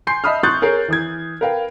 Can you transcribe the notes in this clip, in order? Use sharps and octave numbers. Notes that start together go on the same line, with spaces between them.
G#5 C6 G6 C7
D#5 E5 A5 B5 D#6 F6
C6 C#6 D#6 F#6 G6 A6
G#4 A#4 C#5 C7
E3 D#6 G#6
A#4 B4 F5 G5